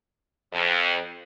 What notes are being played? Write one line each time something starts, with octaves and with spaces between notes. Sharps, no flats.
F2